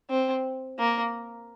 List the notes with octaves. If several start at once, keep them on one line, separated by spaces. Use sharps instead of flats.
C4
A#3